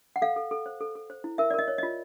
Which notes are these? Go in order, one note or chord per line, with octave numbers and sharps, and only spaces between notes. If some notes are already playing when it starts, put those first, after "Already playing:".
F#5
A4 F5
A4
A4
C5
A4
A4
C5
E4
A#4 E5
D5
A#4 D#5
C#5
D#5
F4